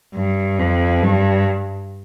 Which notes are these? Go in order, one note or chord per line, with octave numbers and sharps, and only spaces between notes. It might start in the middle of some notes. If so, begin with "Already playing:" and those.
G2
F2
G2